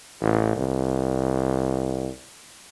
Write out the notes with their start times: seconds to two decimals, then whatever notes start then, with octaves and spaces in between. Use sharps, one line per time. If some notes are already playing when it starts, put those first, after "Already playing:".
0.21 A1
0.56 C2